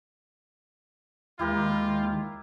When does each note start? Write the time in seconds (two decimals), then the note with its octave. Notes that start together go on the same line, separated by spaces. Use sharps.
1.39 D#2 G#3 E4 F4 G4 A#4